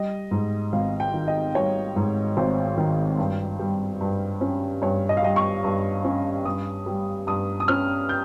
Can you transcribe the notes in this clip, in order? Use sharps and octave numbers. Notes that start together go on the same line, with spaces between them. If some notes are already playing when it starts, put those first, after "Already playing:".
Already playing: G3 D#5
G#2
G#1 F5
G5
D#3
D#5
G3 C#5
G#2
G#1 C5
D#3
G2
G3
G2
C#4
G2 C#5
D#5
F5
G3 D#5
C#6
G2
C#4
G2 D#6
G3
G2 D#6
D#6
C#4 F6
G6